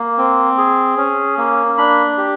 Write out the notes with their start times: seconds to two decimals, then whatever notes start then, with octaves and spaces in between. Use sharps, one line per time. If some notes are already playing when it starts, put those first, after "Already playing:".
Already playing: A#3
0.18 C4
0.58 G#4
0.97 C#4
1.38 A#3
1.78 D4 B5
2.18 G4